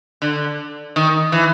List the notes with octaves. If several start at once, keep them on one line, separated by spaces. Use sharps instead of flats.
D3
D#3
E3